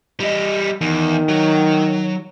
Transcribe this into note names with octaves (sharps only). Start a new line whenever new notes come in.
G3 D#5
E2 D#3
F#3